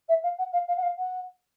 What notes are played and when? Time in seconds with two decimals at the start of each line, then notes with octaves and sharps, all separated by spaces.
0.08 E5
0.23 F5
0.38 F#5
0.52 F5
0.67 F5
0.76 F#5
0.82 F5
0.97 F#5